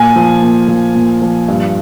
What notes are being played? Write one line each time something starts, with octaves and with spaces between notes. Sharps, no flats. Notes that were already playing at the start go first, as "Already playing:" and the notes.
Already playing: A#2 G#5
F3
A#2
F3
A#2
F3
G2